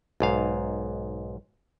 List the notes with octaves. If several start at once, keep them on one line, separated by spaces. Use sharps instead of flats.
B1 G#2 F5